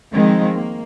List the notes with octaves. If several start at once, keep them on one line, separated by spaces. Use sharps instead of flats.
D#3 F3 G#3 C4
A#3